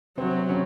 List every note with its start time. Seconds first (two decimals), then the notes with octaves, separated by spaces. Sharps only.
0.17 C3 F#3 C4
0.40 C4
0.49 C#3 C#4